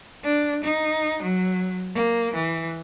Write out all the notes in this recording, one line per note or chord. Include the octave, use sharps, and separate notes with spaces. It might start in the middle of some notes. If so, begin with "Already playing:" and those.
D4
D#4
F#3
A#3
E3